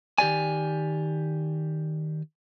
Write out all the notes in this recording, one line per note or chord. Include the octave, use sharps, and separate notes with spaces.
D#3 G4 D5 G#5